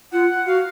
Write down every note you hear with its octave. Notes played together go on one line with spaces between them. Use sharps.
F4 F#5
F#5
F#4 F5